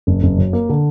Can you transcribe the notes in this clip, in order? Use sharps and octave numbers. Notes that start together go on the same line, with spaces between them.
F#1
F#1
F#2
A#3
D3